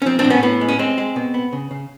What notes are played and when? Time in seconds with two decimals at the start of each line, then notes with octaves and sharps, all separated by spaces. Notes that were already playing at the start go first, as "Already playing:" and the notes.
0.02 C#4
0.06 F3 C4
0.19 C4 D4
0.25 A2
0.30 B3 C#4
0.43 A2 B3
0.61 G#3
0.68 C#4
0.79 G#3 C4
0.98 G#3
1.16 B2
1.34 B3
1.53 C#3
1.71 C#3